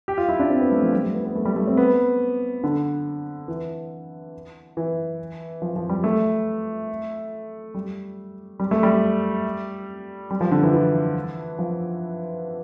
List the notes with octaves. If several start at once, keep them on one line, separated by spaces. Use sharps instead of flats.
G4
F4
E4
D4
C4
B3
A3
F3
G3
A3
B3
B3
A3
G3
A3
C4
B3
D3
E3
E3
F3
F3
G3
A3
G3
G3
A3
G3
G3
F3
D3
E3
E3
F3